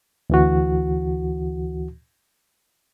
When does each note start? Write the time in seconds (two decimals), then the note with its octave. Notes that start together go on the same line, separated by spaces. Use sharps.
0.30 D2 E3 F#4